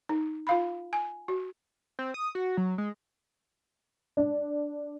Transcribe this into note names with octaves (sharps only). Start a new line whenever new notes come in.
D#4
F4 F5 B5
G#5
F#4
C4
D#6
F#4
F#3
G#3
D4